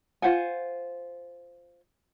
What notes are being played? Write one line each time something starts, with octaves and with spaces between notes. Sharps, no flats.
F4 C5 F#5 G#5